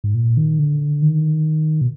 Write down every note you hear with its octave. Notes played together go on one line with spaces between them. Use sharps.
G#2
A#2
D#3
D3
D#3
B2